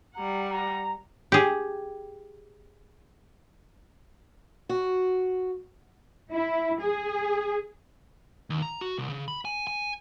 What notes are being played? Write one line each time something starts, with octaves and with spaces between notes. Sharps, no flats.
G3 F#5 A#5
A#5
G4 G#4
F#4
E4
G#4
D#2
A#5
F#4
C2
C#3
B5
G#5
G#5